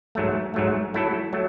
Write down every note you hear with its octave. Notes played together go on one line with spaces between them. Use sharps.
G#2 F#3 A3
G#2 F#3 A3
F#3 A3 E4 A4
F#3 A3